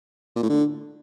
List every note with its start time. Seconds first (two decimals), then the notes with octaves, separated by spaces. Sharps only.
0.36 A#2
0.43 A2
0.49 D3